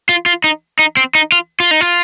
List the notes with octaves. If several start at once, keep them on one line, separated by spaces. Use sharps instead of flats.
F4
F4
D#4
D#4
C4
D#4
F4
F4
D#4
F4